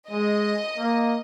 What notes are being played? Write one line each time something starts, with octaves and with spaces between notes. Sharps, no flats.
G#3 D#5
A#3